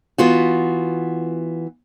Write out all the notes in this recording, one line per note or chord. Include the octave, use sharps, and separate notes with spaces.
E3 B3 F4 F#4